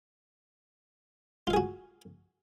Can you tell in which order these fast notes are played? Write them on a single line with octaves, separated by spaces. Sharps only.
F4 F5 G#4 F#4